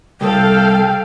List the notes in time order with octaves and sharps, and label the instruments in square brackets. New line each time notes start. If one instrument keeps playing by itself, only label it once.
[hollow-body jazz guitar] C2 [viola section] A4 F5 [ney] G5